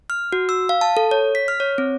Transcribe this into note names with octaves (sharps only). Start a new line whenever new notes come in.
F6
F#4
E6
F5
A5
A4
C#5
B6
F6
C#5
C4